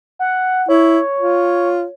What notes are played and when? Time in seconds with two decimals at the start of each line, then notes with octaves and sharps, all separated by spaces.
0.19 F#5
0.69 E4 C#5
1.20 F4